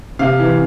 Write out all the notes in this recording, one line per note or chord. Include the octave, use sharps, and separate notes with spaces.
C3 F5
E3